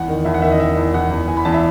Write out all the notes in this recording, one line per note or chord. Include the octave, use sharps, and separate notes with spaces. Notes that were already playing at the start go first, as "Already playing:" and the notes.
Already playing: E2 F#5
D#3
E2 E5
F#5
D#3 E5
D#5
D#3 E5
E2
E2 F#5
E2
E2 G#5
B5
E2 A5
E5